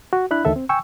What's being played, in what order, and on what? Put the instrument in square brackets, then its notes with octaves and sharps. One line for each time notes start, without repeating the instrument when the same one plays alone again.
[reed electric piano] F#4
D4 E4 B5 F#6
D2 D#3 A4 E5
C4
G5 G#5 C#6 E6